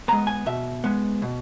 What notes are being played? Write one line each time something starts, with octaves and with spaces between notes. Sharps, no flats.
G#3 B3 A#5
G#5
B2 E5
G#3 B3
B2